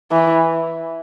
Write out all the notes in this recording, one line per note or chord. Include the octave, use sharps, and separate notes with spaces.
E3